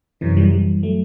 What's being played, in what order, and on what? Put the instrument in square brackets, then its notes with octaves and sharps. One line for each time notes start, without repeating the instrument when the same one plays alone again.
[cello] F#2 [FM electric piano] C3 E3
[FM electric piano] E3 G3
E3 G3
F#3 A3